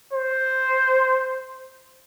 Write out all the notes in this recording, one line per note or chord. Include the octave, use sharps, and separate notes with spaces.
C5